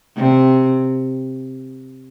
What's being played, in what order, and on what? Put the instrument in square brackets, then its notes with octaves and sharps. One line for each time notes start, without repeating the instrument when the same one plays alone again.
[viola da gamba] C3